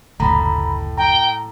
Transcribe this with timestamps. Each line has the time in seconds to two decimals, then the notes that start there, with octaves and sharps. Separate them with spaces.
0.20 F#1 D2 A2 A#5 B5
0.98 G5 A#5